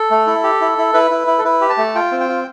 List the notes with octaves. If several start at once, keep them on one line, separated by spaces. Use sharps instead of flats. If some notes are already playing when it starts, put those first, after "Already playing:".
Already playing: A4
A3
E4
G4
E4
E4
E4 B4
E4
E4
A4
E4 B4
G4
A5
A3
F4 G5
C4
G5
F4